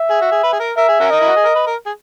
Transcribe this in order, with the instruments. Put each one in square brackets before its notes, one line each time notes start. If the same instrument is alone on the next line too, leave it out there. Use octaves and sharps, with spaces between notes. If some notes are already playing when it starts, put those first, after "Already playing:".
Already playing: [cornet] E5
[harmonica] G#4
F#4
G#4
B4
G#4
A#4
[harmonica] A#4 [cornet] E5
[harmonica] G#4
C#4 F#4 A#4
[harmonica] D#4 [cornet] D#5
[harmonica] E4
F#4
G#4
A#4
B4
A#4
G#4